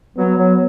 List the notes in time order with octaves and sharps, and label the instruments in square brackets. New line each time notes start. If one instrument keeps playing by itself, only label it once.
[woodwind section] F#3 [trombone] B3
[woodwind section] F#3